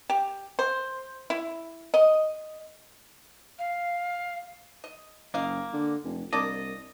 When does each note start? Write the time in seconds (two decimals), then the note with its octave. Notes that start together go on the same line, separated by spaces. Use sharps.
0.10 G4
0.59 C5
1.30 E4
1.94 D#5
3.59 F5
4.84 D#5
5.34 F#1 A#3 D#5 F5
5.73 D3
6.04 F1
6.33 C2 A#3 D4 D5 D#5